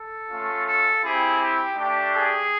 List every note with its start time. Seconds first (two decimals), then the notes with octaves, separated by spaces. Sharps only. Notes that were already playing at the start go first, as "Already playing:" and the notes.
Already playing: A4
0.29 A3 C#4 F4
0.66 A4
1.03 C4 E4 G4 G#4
1.40 G4
1.77 A3 D4 G4
2.13 G#4